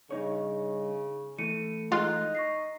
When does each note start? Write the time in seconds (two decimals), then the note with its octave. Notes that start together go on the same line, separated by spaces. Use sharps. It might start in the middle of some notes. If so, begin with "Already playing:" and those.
0.11 G2 C#3 D#4 C#5
1.38 E3 A3 C#7 D#7
1.92 G#3 D#4 F4 F#6
2.35 C#6 A#6 C7